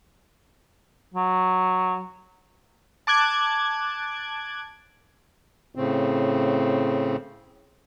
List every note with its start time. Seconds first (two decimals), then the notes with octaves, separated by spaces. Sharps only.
1.14 F#3
3.07 A5 D6 F#6 G#6
5.75 A2 C#3 C4